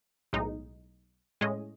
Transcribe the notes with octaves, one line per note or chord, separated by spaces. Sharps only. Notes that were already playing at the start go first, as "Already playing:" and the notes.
B1 A2 G#3 D#4
A2 G#3 C#4 G#4 D#5